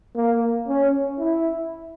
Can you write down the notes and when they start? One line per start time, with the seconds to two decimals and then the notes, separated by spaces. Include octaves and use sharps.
0.16 A#3
0.68 C#4
1.19 E4